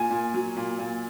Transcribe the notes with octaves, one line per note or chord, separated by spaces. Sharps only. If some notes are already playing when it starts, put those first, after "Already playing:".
Already playing: A#2 G#5
A#2
F#3
A#2
A#2